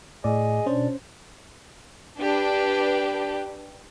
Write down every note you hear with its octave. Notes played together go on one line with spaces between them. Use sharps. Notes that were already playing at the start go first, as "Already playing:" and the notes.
A2 G#4 D5 D#5 G#5
B2 C#4 D4 C5 D5
D4 G4 B4